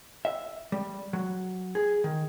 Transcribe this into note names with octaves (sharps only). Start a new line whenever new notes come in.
E5
G3
F#3
G#4
D#3